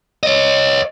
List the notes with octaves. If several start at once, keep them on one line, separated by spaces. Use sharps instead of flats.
C#5 D#5